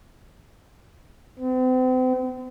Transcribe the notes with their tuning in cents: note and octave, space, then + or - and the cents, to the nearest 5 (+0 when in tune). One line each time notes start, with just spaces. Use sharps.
C4 -40